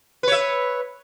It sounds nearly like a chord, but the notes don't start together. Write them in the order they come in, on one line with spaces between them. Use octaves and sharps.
B4 C#5 E5